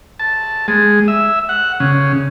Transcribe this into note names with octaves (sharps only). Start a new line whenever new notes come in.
A5
G#3
E5
F#5
C#3